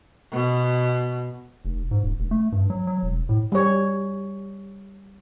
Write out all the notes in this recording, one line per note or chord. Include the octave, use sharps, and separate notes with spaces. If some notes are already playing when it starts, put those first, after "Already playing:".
B2
F1
G#2
D#1
F1
A3
G2
F#3
F#3
E1
A2
G3 C#5